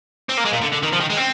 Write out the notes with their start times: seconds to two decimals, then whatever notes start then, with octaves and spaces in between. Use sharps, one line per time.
0.29 C4
0.37 A#3
0.45 G#3
0.53 A#2
0.61 D3
0.72 D3
0.83 D#3
0.93 F3
1.01 D#3
1.10 G#3
1.17 C4